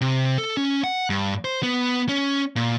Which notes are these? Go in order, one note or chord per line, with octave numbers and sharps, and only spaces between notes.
C3
A4
C#4
F#5
G2
C5
B3
C#4
A#2